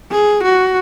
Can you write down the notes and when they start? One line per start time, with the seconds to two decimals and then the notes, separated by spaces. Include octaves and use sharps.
0.11 G#4
0.43 F#4